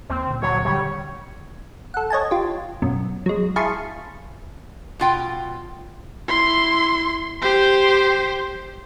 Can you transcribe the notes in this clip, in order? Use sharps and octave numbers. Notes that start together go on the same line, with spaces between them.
D#2 A#3 C4
D2 A#2
F#3 C#5
D#1 D3 G3 C#5
A4 F#5
C#5 D#5 G#5 A5
F4 G4
F#2 B2
F#3 G#3
E4 G#4 F5 A5 C6 C#6
B2 F4 G5
E4 C6
G4 C5